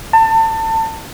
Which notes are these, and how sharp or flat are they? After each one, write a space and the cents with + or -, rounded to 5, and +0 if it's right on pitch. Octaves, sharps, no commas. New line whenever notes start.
A5 +30